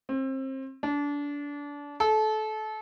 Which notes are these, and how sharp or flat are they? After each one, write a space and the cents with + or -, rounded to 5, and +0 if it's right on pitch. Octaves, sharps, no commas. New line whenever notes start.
C4 +30
D4 -25
A4 -25